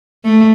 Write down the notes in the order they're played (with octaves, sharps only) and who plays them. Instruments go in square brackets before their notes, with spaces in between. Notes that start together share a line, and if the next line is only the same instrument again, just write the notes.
[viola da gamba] A3